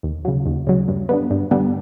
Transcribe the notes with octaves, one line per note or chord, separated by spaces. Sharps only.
D#2
C#3 F#3
D#2
C#3 F#3
G2
D3 G3 B3
G2
D3 G3 B3